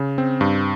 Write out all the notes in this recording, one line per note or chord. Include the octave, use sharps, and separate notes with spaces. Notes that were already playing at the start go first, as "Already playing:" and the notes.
Already playing: C#3
C4
G2